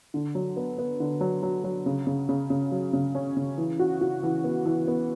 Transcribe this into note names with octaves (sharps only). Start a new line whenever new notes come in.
D3
F#3
B3
B3
D3
F#3
F#3
F#3
C#3
C#3
C#3
C#3
F#3
C#3
C#4
C#3
E3
F#4
F#4
E3
B3
E3
B3